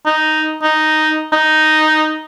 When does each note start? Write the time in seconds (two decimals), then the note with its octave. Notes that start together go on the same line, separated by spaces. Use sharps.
0.06 D#4
0.63 D#4
1.32 D#4